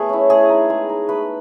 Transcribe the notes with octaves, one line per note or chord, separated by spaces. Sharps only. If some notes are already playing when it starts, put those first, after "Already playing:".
Already playing: A3 B3 G#4 B4
C#4 E4
A3 G#4
D#4
G#3
D#4
A3 B4